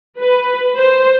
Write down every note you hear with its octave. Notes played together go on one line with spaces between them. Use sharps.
B4
C5